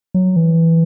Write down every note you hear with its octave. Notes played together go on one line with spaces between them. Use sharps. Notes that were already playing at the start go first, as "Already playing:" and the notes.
F#3
E3